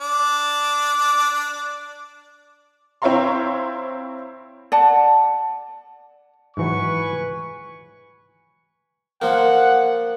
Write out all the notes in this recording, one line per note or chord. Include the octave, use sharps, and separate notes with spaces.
D4 D6
C4 E4 C#5 F5 A#5 C6
D5 F#5 A5
G#2 E3 F#3 B4 G#5 C#6
F3 A#3 F#5